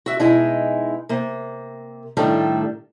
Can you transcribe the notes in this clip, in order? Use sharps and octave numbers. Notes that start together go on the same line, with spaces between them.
F#4 E5
B2 G#3 D#4 E4 G#5
C3 A#3
A2 D#3 G3 A3 D4 A4